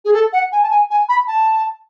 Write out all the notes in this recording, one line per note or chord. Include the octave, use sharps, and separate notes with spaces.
G#4
A4
F#5
G#5
A5
G#5
G#5
B5
A5